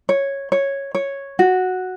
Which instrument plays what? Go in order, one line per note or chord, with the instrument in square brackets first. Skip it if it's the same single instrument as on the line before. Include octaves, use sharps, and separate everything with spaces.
[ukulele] C#5
C#5
C#5
F#4